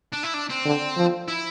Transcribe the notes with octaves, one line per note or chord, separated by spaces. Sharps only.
D4
E4
D4
C4
D3
F3
E4